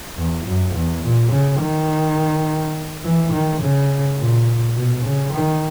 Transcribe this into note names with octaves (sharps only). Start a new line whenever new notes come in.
E2
F#2
E2
A#2
C#3
D#3
E3
D#3
C#3
A#2
B2
C#3
D#3